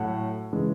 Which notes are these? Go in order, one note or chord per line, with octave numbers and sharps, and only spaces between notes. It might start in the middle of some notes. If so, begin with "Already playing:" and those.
Already playing: A2 F#3 A3 F#5
C#3 E3 G#3